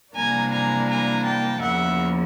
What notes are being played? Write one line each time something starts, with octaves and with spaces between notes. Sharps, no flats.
C3 E3 G3 A#3 D4 G#5 A#5
G#5 A#5
G#5 A#5
G5 A5
E2 C#3 F3 A#3 E5 F#5